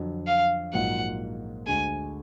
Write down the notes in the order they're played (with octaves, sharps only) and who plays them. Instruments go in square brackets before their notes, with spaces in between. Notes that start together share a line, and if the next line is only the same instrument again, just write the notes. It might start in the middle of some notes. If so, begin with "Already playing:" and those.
Already playing: [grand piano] F2 D3 F#3
[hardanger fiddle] F5
[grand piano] A#1 G#2 F#3 A#3 F4 [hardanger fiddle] F#5
[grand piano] D2 D3 G#3 [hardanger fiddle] G#5